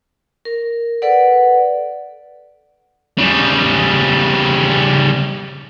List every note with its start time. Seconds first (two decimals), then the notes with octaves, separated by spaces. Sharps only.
0.45 A#4
1.02 A4 B4 D5 F#5
3.18 C#3 G3